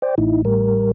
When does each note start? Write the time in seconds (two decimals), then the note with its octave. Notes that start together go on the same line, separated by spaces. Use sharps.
0.02 C5 D5 G5
0.18 A1 D#4 E4
0.45 A2 G3 A#4